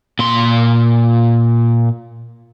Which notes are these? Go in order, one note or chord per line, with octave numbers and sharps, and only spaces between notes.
A#2 C6